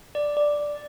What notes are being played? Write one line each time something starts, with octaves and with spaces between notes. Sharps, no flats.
D5
D5